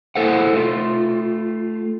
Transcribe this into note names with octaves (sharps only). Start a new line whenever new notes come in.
E4 A4 C5 F#5
A3 F4